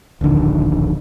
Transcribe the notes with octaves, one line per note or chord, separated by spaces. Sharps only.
D1 A#1 D3 D#3